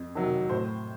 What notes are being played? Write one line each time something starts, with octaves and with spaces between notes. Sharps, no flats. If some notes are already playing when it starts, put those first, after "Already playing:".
Already playing: F2
C3 D#3 F#3
A2 C5